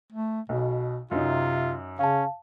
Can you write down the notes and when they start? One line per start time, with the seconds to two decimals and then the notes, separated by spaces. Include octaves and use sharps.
0.12 A3
0.49 B1 B2
1.11 F#2 C3 D#4 F4
1.99 C#3 C#4 F5 A5